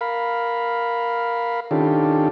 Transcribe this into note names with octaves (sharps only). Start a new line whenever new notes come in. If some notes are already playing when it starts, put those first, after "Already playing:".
A#4 F5 B5
D#3 C#4 D4 F4 G4 A4